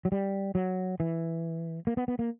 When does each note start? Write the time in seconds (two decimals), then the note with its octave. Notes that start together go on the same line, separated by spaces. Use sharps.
0.05 F#3
0.12 G3
0.55 F#3
1.00 E3
1.87 A#3
1.97 B3
2.08 B3
2.19 A#3